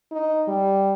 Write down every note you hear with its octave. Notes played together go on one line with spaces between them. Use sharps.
D#4
G3